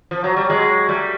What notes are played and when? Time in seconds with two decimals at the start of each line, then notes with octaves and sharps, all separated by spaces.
0.11 F3
0.24 F#3
0.36 G3
0.50 F#3 G#3
0.89 G3 A3